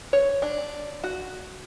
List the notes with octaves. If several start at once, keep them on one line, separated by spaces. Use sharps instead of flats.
C#5
D4
F#4